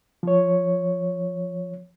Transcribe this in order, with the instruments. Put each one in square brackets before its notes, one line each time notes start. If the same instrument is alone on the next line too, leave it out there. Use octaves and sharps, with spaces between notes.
[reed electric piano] F3 C#5